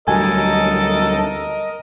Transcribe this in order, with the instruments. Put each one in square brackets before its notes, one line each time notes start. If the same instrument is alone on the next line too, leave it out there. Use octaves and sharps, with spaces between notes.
[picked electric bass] D2 F#3 G3 [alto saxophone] A4 [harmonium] A#4 D#5 [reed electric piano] G#5